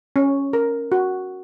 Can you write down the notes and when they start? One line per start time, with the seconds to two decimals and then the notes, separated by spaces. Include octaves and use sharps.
0.16 C#4
0.53 A#4
0.92 F#4